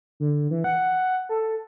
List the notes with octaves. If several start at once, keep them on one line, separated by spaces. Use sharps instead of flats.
D3
E3
F#5
A4